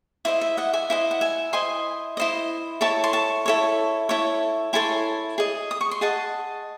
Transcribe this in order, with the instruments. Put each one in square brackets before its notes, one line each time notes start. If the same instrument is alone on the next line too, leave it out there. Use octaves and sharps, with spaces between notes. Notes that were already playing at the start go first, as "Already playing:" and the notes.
[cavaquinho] E4 C5 D#5 E5
E5
D#5 F#5
E5 G#5
E4 C5 D#5
F#5
E5 G#5
E4 C5 D#5 G#5 C6
E4 C5 D#5
E4 A4 C#5 A5 C#6
C6
A5 C#6
E4 A4 C#5
E4 A4 C#5
E4 A4 C#5 G#5 C6
G#4 D#5
D#6
C#6
C6
G#4 D#5 F#5 A5